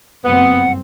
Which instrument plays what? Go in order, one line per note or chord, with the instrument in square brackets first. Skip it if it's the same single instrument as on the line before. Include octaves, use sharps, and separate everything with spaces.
[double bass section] F#1 G2 C4 [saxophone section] B3 [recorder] F#5